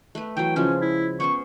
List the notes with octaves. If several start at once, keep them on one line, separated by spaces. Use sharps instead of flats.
A3 B4
E3 F#3 G5
C#3 F3 G#3 C#4
E4
B3 C#4 C5 C#6